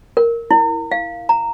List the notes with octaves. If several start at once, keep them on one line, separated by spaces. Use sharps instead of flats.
A#4
E4
F5
A#5